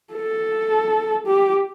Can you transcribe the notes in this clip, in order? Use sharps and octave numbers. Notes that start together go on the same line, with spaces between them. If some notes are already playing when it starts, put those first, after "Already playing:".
A4
G4